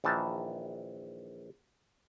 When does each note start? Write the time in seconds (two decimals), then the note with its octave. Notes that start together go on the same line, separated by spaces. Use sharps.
0.04 A#1 D#3 E3 A5